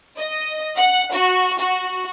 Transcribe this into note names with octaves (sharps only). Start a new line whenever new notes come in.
D#5
F#5
F#4
F#4